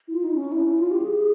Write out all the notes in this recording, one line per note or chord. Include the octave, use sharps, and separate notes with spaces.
E4
F4
D#4
C#4
E4
E4
F4
G4
G#4